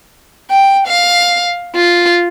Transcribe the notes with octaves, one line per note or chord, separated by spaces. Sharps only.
G5
F5
F4